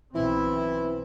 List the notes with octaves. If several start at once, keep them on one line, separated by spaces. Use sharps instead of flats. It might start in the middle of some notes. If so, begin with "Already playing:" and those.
B1 E3 C4 E4